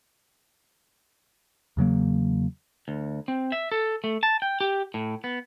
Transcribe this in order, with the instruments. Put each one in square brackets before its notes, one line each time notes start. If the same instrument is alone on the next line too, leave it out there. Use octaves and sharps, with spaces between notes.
[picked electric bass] E2 C#3 F#3 A#3
[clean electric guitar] D2
C4
E5
A4
A3
A5
G5
G4
A2
B3